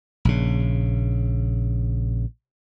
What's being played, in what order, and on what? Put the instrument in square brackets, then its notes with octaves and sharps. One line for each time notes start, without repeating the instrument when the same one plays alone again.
[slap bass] A#1 C#3